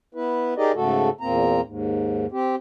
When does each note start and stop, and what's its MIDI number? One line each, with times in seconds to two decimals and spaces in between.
0.15 0.54 59
0.15 0.54 64
0.15 0.54 71
0.57 0.72 63
0.57 0.72 67
0.57 0.72 68
0.57 0.72 70
0.57 0.72 74
0.57 0.72 75
0.75 1.10 44
0.75 1.10 49
0.75 1.10 57
0.75 1.10 66
0.75 1.10 69
1.21 1.61 40
1.21 1.61 46
1.21 1.61 58
1.21 1.61 60
1.21 1.61 82
1.64 2.26 39
1.64 2.26 44
2.32 2.55 60
2.32 2.55 67